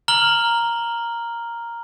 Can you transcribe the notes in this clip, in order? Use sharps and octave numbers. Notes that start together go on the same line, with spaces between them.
A#5 F6 F#7 G7